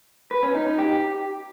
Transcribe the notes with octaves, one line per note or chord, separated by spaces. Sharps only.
B4
C#4
D#4
D#4
G4